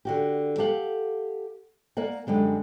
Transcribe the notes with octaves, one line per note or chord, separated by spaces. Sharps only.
D3 F#4 G4
G4 A4 F5 F#5
A#3 A#4 D5 F#5
F#2 D3 G3 G#3